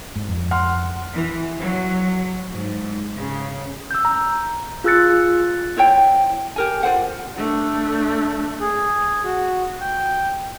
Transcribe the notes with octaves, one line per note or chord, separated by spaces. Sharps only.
G#2
F2
F#5 C6 F6
E3
F#3
G#2
C#3
E6 G6
A#5
F4 G#4 E6 F#6 A6 C#7
E4 C5 C#5 G5
G4 A#4 G#5
F4 A#4 C5 F#5
A3 D4
G#4
F#4
G5